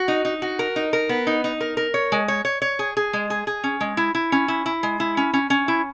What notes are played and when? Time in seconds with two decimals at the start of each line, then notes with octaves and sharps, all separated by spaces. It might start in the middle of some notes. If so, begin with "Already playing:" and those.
Already playing: F#4
0.08 D#4
0.25 D#4
0.42 F#4
0.59 A#4
0.76 D#4
0.93 A#4
1.09 B3
1.27 D#4
1.44 D#4
1.61 A#4
1.77 A#4
1.94 C#5
2.12 G#3
2.28 C#5
2.45 C#5
2.62 C#5
2.79 G#4
2.97 G#4
3.13 G#3
3.30 G#4
3.47 G#4
3.64 C#4
3.81 G#3
3.97 E4
4.15 E4
4.32 C#4
4.48 E4
4.66 E4
4.83 G#3
5.00 E4
5.17 C#4
5.34 C#4
5.50 C#4
5.68 E4